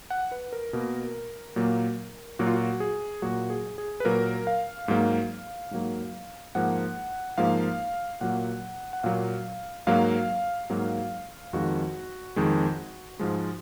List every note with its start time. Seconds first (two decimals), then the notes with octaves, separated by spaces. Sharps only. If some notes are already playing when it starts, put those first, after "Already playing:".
0.10 F#5
0.32 B4
0.53 A#4
0.73 B2 A#3
1.56 A#2 F#3 A#3
2.39 A#2 F#3 A#3 F#4
2.47 F4
2.54 F#4
2.80 G#4
3.22 A#2 F#3 A#3 F#4
3.50 G#4
3.78 G#4
4.00 B4
4.05 A#2 F#3 A#3 A#4
4.47 F5
4.88 G#2 F#3 A#3
5.71 G#2 F#3 A#3
6.55 G#2 F3 A#3 F#5
7.38 G#2 F3 A#3 F5
8.21 A#2 F#3 A#3 F#5
8.93 F#5
9.03 A#2 F#3 A#3 F5
9.87 G#2 F#3 A#3 F5
10.70 G#2 F#3 A#3
11.53 F2 D#3 G#3 F#4
12.36 F2 D#3 G#3
13.20 G#2 F3 G#3